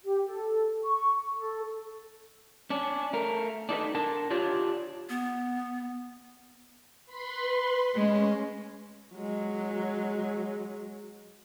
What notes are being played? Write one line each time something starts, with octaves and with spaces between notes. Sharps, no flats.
G4
A4
C#6
A4
C#4 D4
A3 A#4
D4 D#4 A4 B4
D4 A#4 A5
D4 F4 G4 C#5
B3
B4 B5 C6
G#3 C#4
F#3 G#3